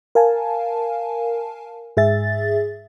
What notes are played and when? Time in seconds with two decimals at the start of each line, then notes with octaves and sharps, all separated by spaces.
0.15 A#4 F5 G#5 A5
1.97 G#2 G#4 E5 A6